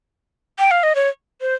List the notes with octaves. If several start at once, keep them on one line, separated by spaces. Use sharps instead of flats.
G5
F5
D#5
C#5
C5